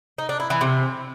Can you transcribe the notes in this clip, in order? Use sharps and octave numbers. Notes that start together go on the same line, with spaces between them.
D#4
D4
E4
E3
C3